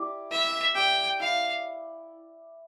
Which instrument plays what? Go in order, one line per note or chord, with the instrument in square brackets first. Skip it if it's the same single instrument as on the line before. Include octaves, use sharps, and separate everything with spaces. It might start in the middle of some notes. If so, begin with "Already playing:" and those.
Already playing: [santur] E4 G4 D5
[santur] E4 [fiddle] E5
[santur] G4 D5 [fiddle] G5
[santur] E4 [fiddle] F5